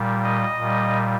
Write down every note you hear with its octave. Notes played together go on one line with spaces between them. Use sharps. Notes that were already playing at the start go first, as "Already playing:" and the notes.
Already playing: A#2 G3
D#5
A#2 G3